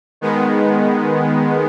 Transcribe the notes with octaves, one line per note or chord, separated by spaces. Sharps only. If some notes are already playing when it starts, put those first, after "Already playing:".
D#3 G#3 B3